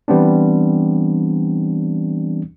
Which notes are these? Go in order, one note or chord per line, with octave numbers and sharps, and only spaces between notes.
E3 G3 B3 C4 D4